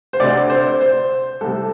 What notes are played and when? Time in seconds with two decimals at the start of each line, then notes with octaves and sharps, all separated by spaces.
0.13 C5
0.20 D2 C3 D5
0.50 C5
0.81 C5
1.41 C2 C3 A4